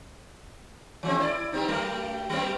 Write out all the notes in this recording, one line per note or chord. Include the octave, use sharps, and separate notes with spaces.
E3 G#3 C4
E4 C5 D5
G3 B3 D#4
F#3 G3 A3
F#3 G3 B3